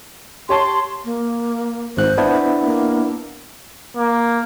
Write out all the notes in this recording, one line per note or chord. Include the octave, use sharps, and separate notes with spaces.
G4 C#5 A5 C6
A#3
G#1 G#2 C5 F#6
B3 D4 E4
A#3
A#3